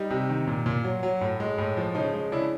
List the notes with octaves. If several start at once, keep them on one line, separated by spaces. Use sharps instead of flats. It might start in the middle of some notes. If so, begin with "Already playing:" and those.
Already playing: G3 D#4
C3
D#3
A#2
A#2
F#3
F#3
A2
G#3
A2
F3
C#3 D#4
G#3
C#3 D4 E4